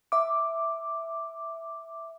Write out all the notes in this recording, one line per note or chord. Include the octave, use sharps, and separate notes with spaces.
E5 D6